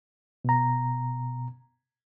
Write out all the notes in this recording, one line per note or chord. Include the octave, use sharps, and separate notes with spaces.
B2 A#5